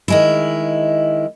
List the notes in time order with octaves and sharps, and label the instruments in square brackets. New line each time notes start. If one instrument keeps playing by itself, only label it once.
[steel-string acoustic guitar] D#3 G#3 E4